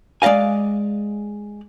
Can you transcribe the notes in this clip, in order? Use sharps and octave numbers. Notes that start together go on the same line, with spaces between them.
G#3 D5 D#5 F5 G#5